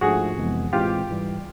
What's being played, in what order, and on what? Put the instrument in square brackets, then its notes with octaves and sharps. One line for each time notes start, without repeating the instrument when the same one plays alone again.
[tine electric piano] G#2 F3 A3 D4 [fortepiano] F#4 G#4
[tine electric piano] F2 C3 E3 G#3 B3
[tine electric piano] A2 E3 G#3 C4 [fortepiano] F4 G4
[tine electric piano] G#2 E3 G3